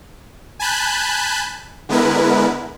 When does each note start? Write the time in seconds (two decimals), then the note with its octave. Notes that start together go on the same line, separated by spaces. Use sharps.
0.59 G#5 A5 B5 F#6 G6
1.89 D3 G#3 B3 E4 A#4 B4